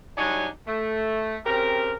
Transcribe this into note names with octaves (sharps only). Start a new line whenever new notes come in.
F#3 G3 D4 D#4 C#5 G#5
A3
C#3 C4 G4 A#4